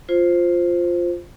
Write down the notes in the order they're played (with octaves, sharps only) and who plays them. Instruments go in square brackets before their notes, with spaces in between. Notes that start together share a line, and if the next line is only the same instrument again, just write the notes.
[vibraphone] F4 C5